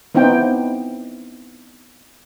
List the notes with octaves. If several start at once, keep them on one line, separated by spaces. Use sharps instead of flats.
B3 C4 D#4 E4 G5